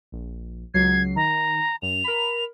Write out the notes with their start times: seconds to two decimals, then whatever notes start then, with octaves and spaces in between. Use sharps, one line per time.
0.12 A#1
0.74 C#2 F#3 G#6 C7
1.16 D#3 A#5
1.82 F#2 F7
2.04 A#4 B5